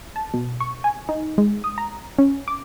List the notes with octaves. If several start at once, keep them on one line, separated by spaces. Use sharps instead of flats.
A5
B2
C#6
G#5
D#4
G#3
D#6
A#5
C#4
D6